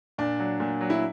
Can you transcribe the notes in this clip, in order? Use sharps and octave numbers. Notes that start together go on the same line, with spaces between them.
A#2 D4
F#3
A#2
F#3
E4